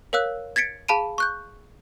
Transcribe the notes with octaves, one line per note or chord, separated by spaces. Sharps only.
A#4 C#5 F5 E6 F#6
G#6 A6 B6 C#7 D7
G#4 F5 A5 B5 D7 D#7
C#6 F#6 G6